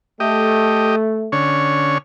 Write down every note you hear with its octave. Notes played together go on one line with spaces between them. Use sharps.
A3 G4 D#5
D3 C#4 C#5